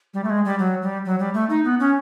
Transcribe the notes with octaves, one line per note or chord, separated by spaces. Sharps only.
G3
A3
G#3
G3
F#3
G3
F#3
G3
A3
D#4
B3
C#4